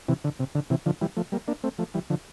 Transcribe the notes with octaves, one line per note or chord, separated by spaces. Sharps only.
C3 E3
D3
C3
D3
C3 E3
D3 F3
E3 G3
F3 A3
G3 A#3
A#3 D4
A3 C4
F3 A3
E3 G3
D3 F3